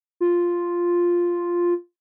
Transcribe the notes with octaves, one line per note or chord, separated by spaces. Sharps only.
F4